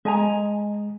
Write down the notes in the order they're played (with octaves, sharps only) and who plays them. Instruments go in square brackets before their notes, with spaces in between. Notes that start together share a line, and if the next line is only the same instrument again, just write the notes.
[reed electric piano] G#3 [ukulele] D#5 G#5 A#5